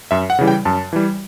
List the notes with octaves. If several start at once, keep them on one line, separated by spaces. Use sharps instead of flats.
F#2 E5
F#5
C#3 E3 G3
G5
F#2 A5
E3 G3